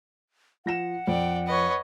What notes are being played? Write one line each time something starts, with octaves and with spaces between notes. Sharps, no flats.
F3 F#5 A#6 E7
F2 D5 G5
B4 C#5 D#5